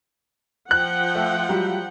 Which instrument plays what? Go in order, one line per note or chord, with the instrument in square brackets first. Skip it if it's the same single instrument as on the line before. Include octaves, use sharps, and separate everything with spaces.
[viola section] F3 F#5 G5 [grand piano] F#6
[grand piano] A3
[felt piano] F#3 G3 F4